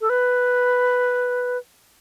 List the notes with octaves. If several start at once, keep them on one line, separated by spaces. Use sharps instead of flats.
A4
B4